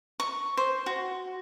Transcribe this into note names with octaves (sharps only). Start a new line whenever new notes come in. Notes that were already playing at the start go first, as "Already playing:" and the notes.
C#6
C5
F#4